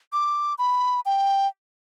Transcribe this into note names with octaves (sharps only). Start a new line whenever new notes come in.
D6
B5
G5